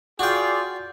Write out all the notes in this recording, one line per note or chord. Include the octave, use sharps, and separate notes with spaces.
F4 F#4 G#4 D5 G5